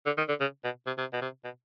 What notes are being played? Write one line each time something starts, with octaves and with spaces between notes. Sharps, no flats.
D3
D#3
D3
C#3
B2
C3
C3
B2
C3
B2